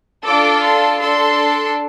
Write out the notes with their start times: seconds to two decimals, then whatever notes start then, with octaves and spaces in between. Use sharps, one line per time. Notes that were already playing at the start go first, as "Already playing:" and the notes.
0.25 D4 F4 A4 D6
0.63 C6
1.00 D4 A4 C6